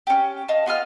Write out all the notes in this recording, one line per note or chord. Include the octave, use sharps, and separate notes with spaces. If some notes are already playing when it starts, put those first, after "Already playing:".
C#4 G4
D#5 F5 A5
B3 F4 D#5 F6